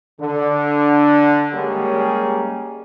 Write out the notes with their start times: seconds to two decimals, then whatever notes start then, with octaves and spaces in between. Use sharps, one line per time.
0.20 D3
1.54 G3 G#3 A#3 C#4 G4 G#4